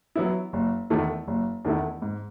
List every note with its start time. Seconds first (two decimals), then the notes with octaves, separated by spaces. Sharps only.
0.16 F#3 B3 E4
0.53 F#1
0.90 E2 D#3 A3 E4
1.28 F#1
1.65 E2 D#3 A3 E4
2.02 G#2